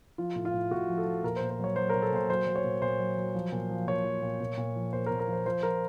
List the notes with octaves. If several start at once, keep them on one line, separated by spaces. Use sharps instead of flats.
F3 F4
A2
F4
A2
A2 F#4
F3
A4
F3
A#2 A#4
A#2 C5
C5
F#3 C#5
F#3 C5
A#2 A#4
A4
A#2 C5
F#3 C5
F#3
C#5
A#2
A#2 C5
F#3
F#3
F3
A#2
F3
A#2 C#5
F3
A#2
A#2
A#2
F3
A#2 C5
A#4
A#2
A#4
F3
C5
F3 C5
F3 A#4